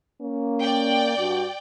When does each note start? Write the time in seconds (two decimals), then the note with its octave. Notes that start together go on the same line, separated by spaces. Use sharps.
0.21 A#3 C#4
0.61 D5 G5
1.18 G2 D4 F#4